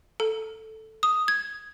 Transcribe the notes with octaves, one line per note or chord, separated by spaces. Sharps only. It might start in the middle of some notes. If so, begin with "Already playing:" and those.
A4
D#6
G#6